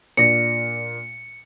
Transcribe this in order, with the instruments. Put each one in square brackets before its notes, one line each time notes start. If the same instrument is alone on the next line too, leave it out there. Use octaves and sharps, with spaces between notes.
[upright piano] A#2 D4 A#6 [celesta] C#7